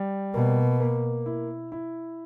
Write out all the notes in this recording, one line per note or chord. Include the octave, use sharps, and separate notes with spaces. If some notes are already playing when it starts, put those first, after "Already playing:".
Already playing: G3
B2 A#3
A#3
E4
E4